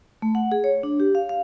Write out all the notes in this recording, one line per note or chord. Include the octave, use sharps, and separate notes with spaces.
A3
F#5
G#4
C#5
D4
G4
F5
F5